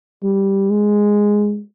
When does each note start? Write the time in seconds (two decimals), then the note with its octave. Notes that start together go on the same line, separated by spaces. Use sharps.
0.23 G3
0.70 G#3